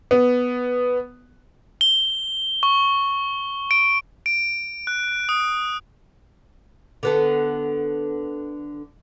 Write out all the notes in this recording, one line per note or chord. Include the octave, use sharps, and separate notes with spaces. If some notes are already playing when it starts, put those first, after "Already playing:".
B3
G7
C#6
D7
D7
F#6
D#6
D3 B3 A4